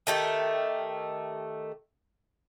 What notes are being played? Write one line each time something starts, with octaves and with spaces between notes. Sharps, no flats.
D#3 A3 G4